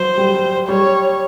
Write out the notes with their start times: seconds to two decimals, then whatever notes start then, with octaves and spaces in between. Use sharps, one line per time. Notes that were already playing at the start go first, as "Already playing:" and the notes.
Already playing: F#3 C5
0.18 G3
0.68 G3 C#5